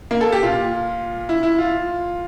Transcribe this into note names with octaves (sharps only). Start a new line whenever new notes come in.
A#3
A4
G4
A#2 F4
E4
E4
F4